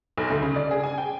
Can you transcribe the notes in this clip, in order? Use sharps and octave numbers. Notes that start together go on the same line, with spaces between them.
B1
D2
C#3
D5
G#4
G#5
G5